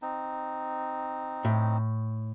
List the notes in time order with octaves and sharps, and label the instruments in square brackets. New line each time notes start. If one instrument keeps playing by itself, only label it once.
[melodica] C4 D#4
[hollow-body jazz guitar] A2